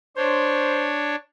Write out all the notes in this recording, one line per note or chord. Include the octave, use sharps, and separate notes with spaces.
D4 C5 C#5